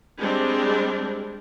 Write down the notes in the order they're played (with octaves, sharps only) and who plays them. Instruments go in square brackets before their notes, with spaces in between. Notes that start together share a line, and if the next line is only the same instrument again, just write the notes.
[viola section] G3 G#3 C4 D4